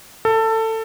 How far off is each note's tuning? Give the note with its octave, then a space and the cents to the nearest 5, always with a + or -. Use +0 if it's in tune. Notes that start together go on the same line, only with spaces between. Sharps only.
A4 +20